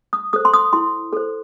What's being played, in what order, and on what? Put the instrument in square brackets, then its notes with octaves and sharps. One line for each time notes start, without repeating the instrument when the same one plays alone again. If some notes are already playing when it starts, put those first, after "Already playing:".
[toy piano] D#6
A4 C5 D#6
C6
D#6
E4 C6
A4 C5